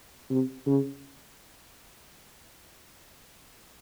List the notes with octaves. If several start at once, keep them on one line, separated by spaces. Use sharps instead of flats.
C3
C#3